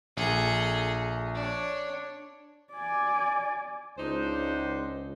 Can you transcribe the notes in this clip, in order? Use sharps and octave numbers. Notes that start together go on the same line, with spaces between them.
A#1 G#4 A4
D4 C#5
D5 G#5
C#2 D4 D#4 C5